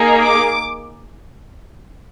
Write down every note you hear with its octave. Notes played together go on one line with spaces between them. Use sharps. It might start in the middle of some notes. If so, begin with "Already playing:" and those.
Already playing: A#3 D#4 G#4
D6